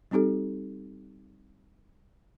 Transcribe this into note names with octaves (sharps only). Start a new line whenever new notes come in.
G3 C4 D#4 G4 A4